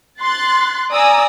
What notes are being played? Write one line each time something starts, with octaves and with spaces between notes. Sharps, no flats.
C6 F#6 A6
D5 G#5 A#5 D#6 E6